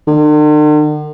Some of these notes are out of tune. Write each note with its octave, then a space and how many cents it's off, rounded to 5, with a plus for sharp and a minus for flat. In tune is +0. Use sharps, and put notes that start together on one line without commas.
D3 +45